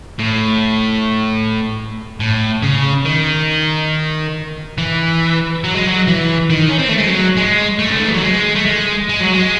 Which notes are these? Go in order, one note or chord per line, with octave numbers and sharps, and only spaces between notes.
A2
A2
C#3
D#3
E3
F#3
G#3
F#3
E3
D#3
C#4
C4
A3
G#3
F#3
G#3
A3
C#3
D#3
E3
F#3
G#3
A3
G#3
G#3
F#3
G#3